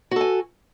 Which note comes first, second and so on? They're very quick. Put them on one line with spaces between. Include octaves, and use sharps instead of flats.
F#4 A4 G#5